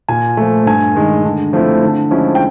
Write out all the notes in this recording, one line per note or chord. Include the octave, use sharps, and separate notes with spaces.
A#2 G#5
F3 A3
G2 G#5
D#3 G#3
D3
F3 A3 C4 E4
D3
F3 G#3 C#4 E4
G5